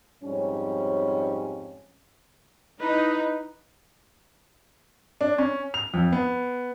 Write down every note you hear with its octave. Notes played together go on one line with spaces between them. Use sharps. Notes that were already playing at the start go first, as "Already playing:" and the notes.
F2 G#2 G3 C#4
D#4 E4 B4
D4
C#4
F7
F2
B3